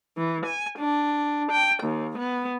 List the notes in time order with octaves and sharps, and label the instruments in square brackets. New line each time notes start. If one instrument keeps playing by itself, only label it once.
[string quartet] E3
G#5
D4
G5
D#2
B3